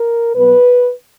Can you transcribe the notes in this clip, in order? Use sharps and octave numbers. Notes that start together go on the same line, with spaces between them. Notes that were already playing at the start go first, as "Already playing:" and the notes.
Already playing: A#4
B2 F#3 B3 B4